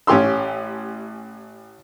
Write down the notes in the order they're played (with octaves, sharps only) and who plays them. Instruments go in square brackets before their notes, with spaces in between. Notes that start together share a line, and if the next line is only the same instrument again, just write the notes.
[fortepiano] A1 C#4 G4 C6 E6